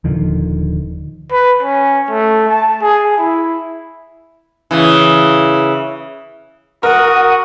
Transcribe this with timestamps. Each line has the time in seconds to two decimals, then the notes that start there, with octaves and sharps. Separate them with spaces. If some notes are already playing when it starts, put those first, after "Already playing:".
0.04 D#1 D3 D#3 F3
1.31 B4
1.62 C#4
2.10 A3
2.48 A5
2.81 G#4
3.18 E4
4.71 C#3 E3
6.83 F#4 A#4 F#5 D#6